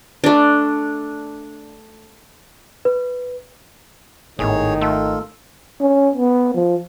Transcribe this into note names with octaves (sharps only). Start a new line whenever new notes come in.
A3 D4
B4
G#1 A2 D#3 B3 G#4 C#5
A3 F4 A4
C#4
B3
F3